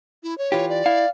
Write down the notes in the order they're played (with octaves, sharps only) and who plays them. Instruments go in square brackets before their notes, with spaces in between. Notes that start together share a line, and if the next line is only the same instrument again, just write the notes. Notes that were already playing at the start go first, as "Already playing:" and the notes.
[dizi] E4
C#5
[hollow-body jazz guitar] E3 F4 G4
[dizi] D5
[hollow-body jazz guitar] E4 [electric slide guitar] F5